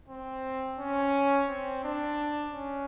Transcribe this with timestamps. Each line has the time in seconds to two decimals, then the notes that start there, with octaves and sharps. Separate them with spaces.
0.09 C4
0.78 C#4
1.48 C4
1.84 D4
2.53 C#4